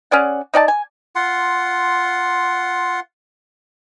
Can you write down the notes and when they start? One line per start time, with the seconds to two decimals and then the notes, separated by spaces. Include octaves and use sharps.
0.11 C#4 G#4 D5 F#5
0.54 D#4 D5 F#5 A5
0.68 G#5
1.15 F4 F#5 C6